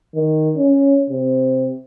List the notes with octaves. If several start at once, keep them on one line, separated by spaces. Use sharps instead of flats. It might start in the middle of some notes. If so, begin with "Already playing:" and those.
D#3
C#4
C3